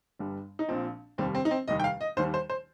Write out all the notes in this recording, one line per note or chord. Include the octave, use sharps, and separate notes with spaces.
G1 G2 G3
D#4
A#1 A#2 F3 C4
F1 D#2 D#3 G3 C4
C4
D#4
C4
F1 D#2 D#3 G3 D#5
G5
F5
D#5
D#2 D#3 G3 C5
C5
C5